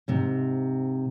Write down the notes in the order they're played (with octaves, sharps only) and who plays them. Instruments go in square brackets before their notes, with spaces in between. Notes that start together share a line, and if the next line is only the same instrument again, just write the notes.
[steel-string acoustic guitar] G#2 C3